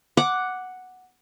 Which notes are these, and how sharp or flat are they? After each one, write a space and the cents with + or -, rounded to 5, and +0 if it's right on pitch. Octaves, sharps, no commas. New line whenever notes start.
F#5 +0 D6 +0